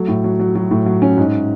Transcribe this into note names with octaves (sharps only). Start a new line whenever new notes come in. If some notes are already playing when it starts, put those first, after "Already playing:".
Already playing: F#3 A3
A2
F#3
F#3
F#3
A2
F#3
C#4
G#2